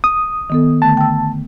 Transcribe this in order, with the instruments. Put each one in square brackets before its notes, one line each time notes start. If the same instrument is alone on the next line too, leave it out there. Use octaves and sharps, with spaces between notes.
[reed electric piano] D#6
[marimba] D#3 B3 A4
[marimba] D3 A3 [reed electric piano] A5
[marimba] G5 E6